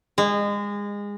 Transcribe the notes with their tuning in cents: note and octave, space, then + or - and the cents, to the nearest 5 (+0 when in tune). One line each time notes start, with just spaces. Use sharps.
G#3 -25